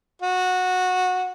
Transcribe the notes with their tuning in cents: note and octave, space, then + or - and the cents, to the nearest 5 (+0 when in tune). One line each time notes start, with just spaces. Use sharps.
F#4 -15